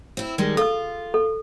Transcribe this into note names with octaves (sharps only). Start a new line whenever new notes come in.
C4 E4
D#3 G3 G#3
F4 A4 E6
A4